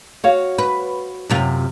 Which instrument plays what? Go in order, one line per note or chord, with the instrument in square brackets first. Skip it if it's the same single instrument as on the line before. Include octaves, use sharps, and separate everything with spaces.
[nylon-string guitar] F#4 C#5 F5
[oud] B4
F#2 C3 F4